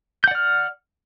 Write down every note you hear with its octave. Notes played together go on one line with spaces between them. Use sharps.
D5 F#5 F6 G6